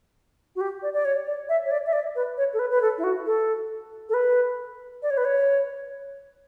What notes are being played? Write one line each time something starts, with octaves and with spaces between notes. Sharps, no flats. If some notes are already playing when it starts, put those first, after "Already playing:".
F#4
G4
D5
D5
C#5
D5
E5
C#5
D5
E5
D5
B4
C#5
A4
B4
B4
A4
E4
F#4
A4
A4
B4
D5
C#5
B4
C#5